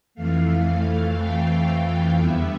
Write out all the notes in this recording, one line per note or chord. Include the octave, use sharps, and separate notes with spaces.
F2 E3 A3 F5
G5
F5
E2 D3 G3 B3 E5